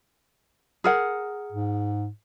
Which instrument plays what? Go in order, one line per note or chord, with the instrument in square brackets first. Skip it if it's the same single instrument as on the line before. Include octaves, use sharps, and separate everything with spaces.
[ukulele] G#4 A#4 F#5
[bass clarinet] G#2